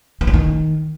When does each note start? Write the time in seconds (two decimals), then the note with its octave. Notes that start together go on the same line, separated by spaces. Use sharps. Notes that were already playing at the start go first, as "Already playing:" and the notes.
0.21 E3
0.27 C#3
0.34 D#3